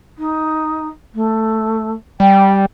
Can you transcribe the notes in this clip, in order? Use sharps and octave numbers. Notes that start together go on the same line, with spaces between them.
D#4
A3
G3 G5